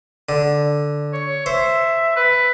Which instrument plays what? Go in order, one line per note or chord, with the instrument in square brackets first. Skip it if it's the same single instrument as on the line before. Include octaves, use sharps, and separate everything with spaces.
[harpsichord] D3
[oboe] C#5
[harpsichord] C5 [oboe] E5
[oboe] B4